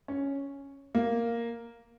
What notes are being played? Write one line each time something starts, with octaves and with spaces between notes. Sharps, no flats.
C#4
A#3